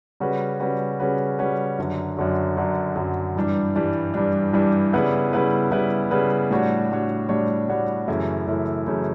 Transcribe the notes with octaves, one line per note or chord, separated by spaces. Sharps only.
C#3 G3 C#4 F#4 B4
C#3 G3 C#4 F#4 B4
C#3 G3 C#4 F#4 B4
C#3 G3 C#4 F#4 B4
F#2 D3 F#3
F#2 D3 F#3
F#2 D3 F#3
F#2 D3 F#3
G2 E3 G3 D4
G2 E3 G3 D4
G2 E3 G3 D4
G2 E3 G3 D4
C#3 G3 B3 E4 B4
C#3 G3 B3 E4 B4
C#3 G3 B3 E4 B4
C#3 G3 B3 E4 B4
A2 G3 D4 F#4 C#5
A2 G3 D4 F#4 C#5
A2 G3 D4 F#4 C#5
A2 G3 D4 F#4 C#5
F#2 C#3 E3 A3 E4
F#2 C#3 E3 A3 E4
F#2 C#3 E3 A3 E4